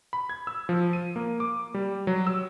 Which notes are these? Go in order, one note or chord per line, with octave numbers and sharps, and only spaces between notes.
B5
G#6
E6
F3
D#7
A#3
D6
G3
F#3
E6